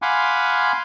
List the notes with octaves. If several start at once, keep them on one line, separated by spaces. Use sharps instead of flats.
F5 F#5 G#5 B5 C6 D6